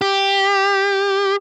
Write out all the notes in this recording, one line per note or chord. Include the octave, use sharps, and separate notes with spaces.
G4